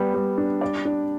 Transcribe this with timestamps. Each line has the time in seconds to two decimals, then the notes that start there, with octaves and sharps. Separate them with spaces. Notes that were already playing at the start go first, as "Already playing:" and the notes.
Already playing: G3 B3
0.14 G3
0.38 D4
0.61 D5
0.85 D4